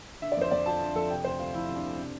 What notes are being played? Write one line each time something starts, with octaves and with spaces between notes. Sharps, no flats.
D3 E5
D5
F2 C5
F2 D5
F3 A5
D3
F2 A4
C3 G5
D2 C5
D2 F4
F3 E4
C3
D4
D2
C3